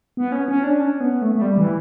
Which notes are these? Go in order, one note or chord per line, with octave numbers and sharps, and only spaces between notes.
B3
C#4
C#4
D4
C#4
B3
A3
A3
G3
E3